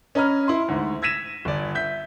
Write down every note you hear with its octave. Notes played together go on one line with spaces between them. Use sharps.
C#4 D#5 A#5 B5 F6
E4 C6
D2 G#2
E6 G#6 A#6 B6 D#7 E7
G1 D5
E5 G6 B6